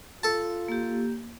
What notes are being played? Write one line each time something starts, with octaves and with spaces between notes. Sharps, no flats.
F4 A4 A5
A#3 G4